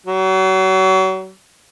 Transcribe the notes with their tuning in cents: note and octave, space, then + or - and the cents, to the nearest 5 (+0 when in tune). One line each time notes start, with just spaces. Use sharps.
F#3 +35